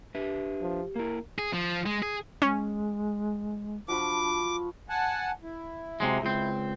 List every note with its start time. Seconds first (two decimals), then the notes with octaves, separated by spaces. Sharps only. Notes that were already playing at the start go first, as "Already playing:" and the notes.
0.15 D4 G4 B4 E5
0.61 F3
0.96 A#3 E4 A#4
1.39 G#4
1.53 F3
1.86 G#3
2.02 G#4
2.42 G#3 C#4
3.88 F3 D4 F#4 B5 D6
4.89 F#5 G#5 A5
5.43 E4
6.00 C3 F#3 G#3
6.22 C#2 C4